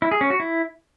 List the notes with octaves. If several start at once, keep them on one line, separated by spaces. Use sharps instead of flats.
E4
G#4
C#4
F#4
E4